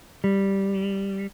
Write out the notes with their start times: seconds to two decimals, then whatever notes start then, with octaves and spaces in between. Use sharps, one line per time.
0.24 G3